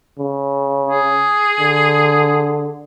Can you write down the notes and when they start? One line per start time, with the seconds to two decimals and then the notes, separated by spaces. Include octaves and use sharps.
0.19 C#3
0.86 G#4
1.60 D3